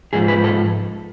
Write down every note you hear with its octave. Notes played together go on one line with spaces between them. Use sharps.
G#2 F3 G#4
B4
A4